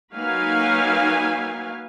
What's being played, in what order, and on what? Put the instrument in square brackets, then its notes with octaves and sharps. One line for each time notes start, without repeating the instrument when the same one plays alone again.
[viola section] F#3 A#3 D#4 B4 F5 G#5